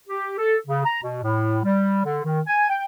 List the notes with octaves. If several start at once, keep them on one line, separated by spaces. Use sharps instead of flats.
G4
A4
C#3
A#5
B2
A2
G3
D3
D#3
G#5
G5